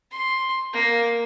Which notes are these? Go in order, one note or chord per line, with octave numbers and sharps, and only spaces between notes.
C6
A#3